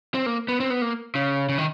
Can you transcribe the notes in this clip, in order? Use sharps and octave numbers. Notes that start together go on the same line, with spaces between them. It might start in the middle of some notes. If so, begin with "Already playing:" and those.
C4
A#3
B3
C4
B3
A#3
C#3
C#3
D#3